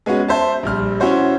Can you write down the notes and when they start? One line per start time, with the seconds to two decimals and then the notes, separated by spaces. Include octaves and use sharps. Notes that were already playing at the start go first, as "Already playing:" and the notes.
0.06 G#3 B3 C#4 F#4
0.28 C5 E5 A5
0.63 A#1 G3 F6
1.00 C#4 E4 F#4 C5 C#5